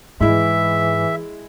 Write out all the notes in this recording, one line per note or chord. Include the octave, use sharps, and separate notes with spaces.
G#2 E3 G#3 E4 E5